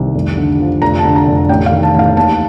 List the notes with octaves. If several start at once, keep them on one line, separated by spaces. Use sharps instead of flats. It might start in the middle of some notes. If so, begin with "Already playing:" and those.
Already playing: C2 D#3
F1
D3
F3
F1 A#5
A5
D3
A#5
F1
A1 G5
F5
D#3
A5
A1 F5
D#2 A5